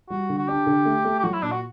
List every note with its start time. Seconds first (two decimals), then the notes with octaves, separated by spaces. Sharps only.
0.10 G3 F#4
0.29 D3
0.38 F#4
0.48 D4 G4
0.67 D3
0.85 A3
1.05 A3
1.19 G4
1.23 F#3 F#4
1.34 E4
1.42 A#2 D4
1.52 F#4